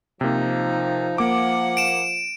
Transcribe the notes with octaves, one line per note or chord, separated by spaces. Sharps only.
C3 F3 A#3 D#4
A#3 F#5 D6
D7 E7